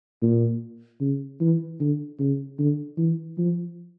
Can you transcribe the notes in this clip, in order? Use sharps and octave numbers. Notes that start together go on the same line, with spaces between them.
A#2
C#3
E3
D3
C#3
D3
E3
F3